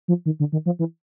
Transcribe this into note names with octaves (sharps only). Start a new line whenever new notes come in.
F3
D#3
D3
D#3
F3
E3